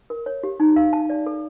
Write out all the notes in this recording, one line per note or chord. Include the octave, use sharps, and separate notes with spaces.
A#4
C#5
G4
D#4
F5
A5
D5
A4